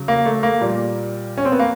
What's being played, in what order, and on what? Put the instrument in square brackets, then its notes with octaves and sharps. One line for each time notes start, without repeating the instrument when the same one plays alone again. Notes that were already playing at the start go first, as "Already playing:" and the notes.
Already playing: [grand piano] C#3 F#3
A#3
A3
A#3
A#2 G3
C#4
C4
B3
A#3